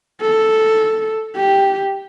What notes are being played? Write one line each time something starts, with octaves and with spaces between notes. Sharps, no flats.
A4
G4